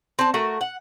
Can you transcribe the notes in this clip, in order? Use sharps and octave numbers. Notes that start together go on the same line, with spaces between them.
C4 A5
A3 F#4 A#4
F#5